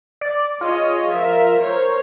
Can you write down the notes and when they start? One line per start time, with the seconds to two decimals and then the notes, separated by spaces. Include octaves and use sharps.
0.21 D5
0.61 F4 G#4 C#5 D#5
1.11 F3 A#4 E5
1.59 A#4 C5 C#5